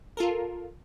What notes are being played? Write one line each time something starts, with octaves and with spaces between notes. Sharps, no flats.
F4 A4 A#4